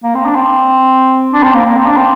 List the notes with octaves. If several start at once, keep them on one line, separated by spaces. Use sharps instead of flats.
A#3
C4
D4
C4
D4
C4
A#3
A#3
C4
D4
C4